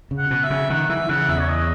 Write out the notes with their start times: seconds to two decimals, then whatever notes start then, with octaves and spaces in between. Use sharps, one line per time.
0.11 C#3
0.18 F#5
0.31 B2
0.43 E5
0.50 C#3
0.70 D#3 F#5
0.89 E3 E5
1.09 C#3 F#5
1.28 E2 E5
1.40 C#5
1.48 D#5